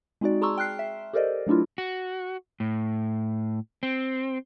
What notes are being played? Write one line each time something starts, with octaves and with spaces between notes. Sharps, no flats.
G#3 C4 D#4 F#4 D5
G#4 A5 A#5 C6 C#6 E6
G5 F6 F#6 C7
E5
G4 A4 A#4 C5 D5 D#5
F#3 A3 D4 E4 F4
F#4
A2
C4